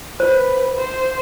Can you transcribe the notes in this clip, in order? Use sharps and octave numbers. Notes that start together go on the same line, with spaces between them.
B4 C5
C5